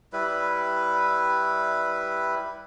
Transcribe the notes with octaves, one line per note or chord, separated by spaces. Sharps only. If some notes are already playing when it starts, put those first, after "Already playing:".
G3 E4 B4